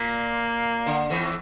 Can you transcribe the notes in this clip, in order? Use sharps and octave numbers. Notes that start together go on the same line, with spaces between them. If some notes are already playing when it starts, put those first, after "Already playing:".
Already playing: A#2 A#3
D3
E2 E3